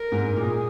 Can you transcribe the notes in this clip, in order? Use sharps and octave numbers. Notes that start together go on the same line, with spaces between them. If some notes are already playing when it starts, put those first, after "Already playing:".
Already playing: A#4
G#2
A#2 G#4